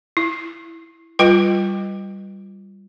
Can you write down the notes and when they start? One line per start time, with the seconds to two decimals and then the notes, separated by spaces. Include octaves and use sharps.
0.17 E4
1.19 G3 F4 B4 G5